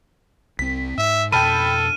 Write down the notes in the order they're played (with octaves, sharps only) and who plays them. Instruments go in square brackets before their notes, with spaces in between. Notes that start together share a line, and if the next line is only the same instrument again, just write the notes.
[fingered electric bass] C2 C4 [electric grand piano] B6
[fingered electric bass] G#2 [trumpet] E5
[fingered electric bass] F2 B2 [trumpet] A4 [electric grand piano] G5 A5 B5 [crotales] F6 D#7